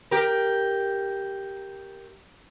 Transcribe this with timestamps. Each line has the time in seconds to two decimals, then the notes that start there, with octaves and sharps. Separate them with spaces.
0.11 G4 A#4